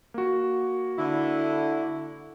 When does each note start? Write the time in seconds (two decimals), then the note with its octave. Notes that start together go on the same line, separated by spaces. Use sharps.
0.14 A#3 F#4
0.97 D3 E4